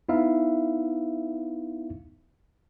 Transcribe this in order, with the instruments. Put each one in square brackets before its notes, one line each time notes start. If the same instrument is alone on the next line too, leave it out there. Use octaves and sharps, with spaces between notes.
[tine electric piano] B3 D#4 E4 E5 F5